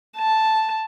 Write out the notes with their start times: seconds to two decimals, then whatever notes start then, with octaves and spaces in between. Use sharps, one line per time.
0.17 A5